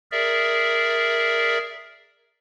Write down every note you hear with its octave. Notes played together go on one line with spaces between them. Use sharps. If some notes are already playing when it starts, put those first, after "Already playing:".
G#4 A#4 D5 E5